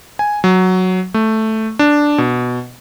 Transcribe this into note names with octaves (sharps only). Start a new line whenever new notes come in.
G#5
F#3
A3
D4
B2